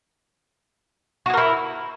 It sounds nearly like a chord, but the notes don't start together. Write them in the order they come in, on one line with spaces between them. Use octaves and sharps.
F#4 G#4 A#4 E4